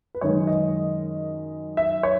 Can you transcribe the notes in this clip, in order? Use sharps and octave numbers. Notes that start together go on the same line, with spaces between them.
B4
F#2 D#3 G#3 C#5
D#5
E5
C#5